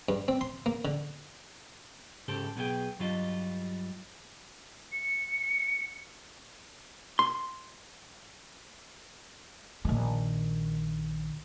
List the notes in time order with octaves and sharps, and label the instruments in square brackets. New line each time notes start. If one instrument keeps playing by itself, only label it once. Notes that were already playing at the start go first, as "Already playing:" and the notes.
[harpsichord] G2
C4
C6
A#3
D3
[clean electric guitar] G#2 C#3 G4 A4 C5
B1 B2 B3 G#4 G5
G2 F#3 G3 F4 D5 D#5
[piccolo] C#7
[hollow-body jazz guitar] C6
[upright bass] A#1 D#3